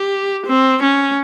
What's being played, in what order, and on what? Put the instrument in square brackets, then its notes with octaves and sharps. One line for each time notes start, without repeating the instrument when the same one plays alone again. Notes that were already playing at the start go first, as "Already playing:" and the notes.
Already playing: [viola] G4
C4
C#4